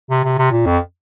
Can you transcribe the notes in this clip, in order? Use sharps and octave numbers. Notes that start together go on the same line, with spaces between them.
C3
C3
C3
A#2
F2